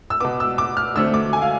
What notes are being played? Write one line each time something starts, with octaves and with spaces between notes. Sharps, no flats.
E6
B2 B3 D6
E6
D6
F6
D2 D3 A3 C4 E6
D6
G#5
F5